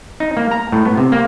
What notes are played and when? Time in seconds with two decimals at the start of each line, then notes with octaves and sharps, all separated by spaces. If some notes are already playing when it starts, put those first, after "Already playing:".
0.20 D#4
0.37 A#3
0.51 A#5
0.72 A2
0.85 B3
0.97 C3
1.12 A#3